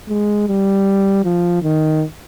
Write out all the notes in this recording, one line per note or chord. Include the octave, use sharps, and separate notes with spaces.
G#3
G3
F3
D#3